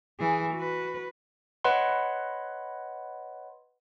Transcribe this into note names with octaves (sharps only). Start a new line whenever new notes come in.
E3 G#4
F#4 B4
B4 C#5 D#5 F#5 B5 C6